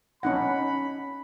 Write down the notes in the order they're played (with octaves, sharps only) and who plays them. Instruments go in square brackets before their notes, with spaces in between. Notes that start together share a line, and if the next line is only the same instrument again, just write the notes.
[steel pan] C#4 D#4 F#5 [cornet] B5